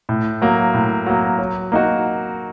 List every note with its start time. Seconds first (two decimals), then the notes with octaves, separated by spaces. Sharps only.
0.09 A2
0.42 F#3 A#3
0.74 A2
1.06 F#3 A#3
1.39 F#3
1.72 A#3 D#4 F#4